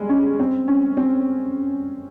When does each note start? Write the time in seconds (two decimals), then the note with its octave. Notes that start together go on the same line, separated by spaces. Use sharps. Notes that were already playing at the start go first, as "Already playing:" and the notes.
Already playing: G3 G#3
0.09 C#4
0.39 C4
0.68 C#4
0.97 C4